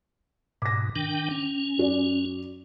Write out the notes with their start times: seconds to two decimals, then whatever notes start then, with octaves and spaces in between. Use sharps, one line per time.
0.62 G#2 B2 D6 A#6
0.96 D#3 D4 G5
1.31 C#4
1.77 F#2 F#4 D5